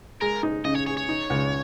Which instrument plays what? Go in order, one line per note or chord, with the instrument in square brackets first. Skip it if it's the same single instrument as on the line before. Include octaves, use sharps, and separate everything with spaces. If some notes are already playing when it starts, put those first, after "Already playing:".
[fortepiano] G#3 [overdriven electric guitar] A#4
[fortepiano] D#4
[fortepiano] C#3 [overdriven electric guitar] D#5
[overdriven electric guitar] C#5
[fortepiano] G#4 [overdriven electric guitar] C#5
[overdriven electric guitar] C#5
[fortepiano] D#4
C#2